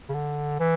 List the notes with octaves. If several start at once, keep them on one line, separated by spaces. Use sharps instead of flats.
C#3
D3
E3